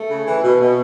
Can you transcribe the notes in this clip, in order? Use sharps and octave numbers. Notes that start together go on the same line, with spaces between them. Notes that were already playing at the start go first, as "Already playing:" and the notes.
Already playing: A3
C#3
E3
B2
B2